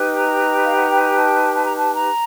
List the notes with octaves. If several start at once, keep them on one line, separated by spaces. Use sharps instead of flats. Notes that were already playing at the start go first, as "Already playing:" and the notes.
Already playing: D#4 G4 B4
A#5
F5
F#5
G5
G#5
A5
A5
A#5
A5
A#5